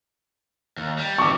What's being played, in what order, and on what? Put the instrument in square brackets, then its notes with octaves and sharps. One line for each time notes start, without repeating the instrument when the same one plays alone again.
[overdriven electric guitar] D#2
G3
[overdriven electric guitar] D2 E3 [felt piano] C#6 D6